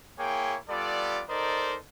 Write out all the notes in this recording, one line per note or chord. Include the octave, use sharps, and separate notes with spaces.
A#3 E4 G#4 C#5 G5
G3 B3 F4 A4 D5
D#4 A4 A#4 C5 D5 D#5